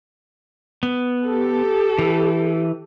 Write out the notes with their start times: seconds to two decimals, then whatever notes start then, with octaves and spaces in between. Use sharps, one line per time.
0.83 B3
1.27 G4 A4
1.99 E3